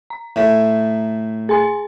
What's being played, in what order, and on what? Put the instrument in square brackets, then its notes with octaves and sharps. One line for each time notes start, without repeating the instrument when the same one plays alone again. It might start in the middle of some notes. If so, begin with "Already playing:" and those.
[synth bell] A#5
[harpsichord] A2 A3
[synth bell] G#4 G#5 C6